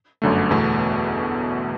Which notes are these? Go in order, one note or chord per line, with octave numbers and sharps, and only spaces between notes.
G1 F#2 D3 A3
E2 B2 A3